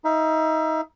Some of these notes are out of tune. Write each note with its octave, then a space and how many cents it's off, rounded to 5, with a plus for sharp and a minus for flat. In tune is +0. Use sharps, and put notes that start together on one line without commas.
D#4 +25 E5 +30